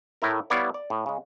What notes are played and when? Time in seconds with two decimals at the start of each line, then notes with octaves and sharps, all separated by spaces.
0.22 A2 A3 E4 A#4
0.50 G3 B3 E4 C#5 D5 F5
0.74 D5
0.90 A2
1.06 C#3 G#3